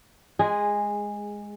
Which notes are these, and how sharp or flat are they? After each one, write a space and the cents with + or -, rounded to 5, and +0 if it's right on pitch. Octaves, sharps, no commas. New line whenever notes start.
G#3 +0 G#4 -15